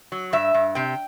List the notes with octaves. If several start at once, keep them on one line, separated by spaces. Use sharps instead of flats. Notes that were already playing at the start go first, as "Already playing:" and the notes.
F#3
G2 E5
G2
C3 G5